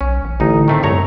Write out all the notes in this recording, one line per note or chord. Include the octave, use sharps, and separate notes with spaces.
B1 C#4
A1
A1 D3 D#4
D#3 A3 C4
C2 F#2 C#5 A#5